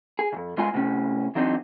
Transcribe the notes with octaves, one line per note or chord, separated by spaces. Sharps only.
G#4
C2 F2
G#2 G#3 F4 G#5
A2 C3 C#4
E3 F#3 C4 D4 D#4